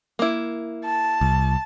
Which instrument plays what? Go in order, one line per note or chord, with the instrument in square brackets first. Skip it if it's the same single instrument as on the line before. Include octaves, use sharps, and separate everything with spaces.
[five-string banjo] A#3 E4
[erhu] A5
[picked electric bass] C2